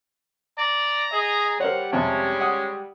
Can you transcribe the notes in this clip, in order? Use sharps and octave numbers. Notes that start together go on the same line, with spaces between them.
D5 A#5
G#4 D#5
G3 A#4 C5 C#5 F#5
F2 C3 G#3 C#4
F#5 D#6